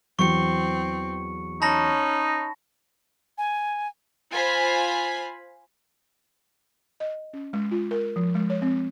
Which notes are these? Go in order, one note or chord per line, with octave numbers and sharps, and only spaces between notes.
E2 E3 F#3 C4 C#6 C#7
C#4 D#4 A5 B5 A#6
G#5
F4 C5 G#5 B5
D#5
C#4
G#3
F4
A#4
F3
G#3
C#5
C4